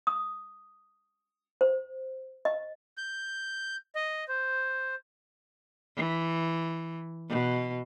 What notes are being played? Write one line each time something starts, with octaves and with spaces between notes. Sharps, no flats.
D#6
C5
D#5
G6
D#5
C5
E3
B2